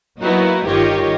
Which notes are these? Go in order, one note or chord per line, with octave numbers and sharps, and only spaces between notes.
F#3 A#3 B3 D#4 E4 F#4
G1 D#3 F4 G4 C#5 D#5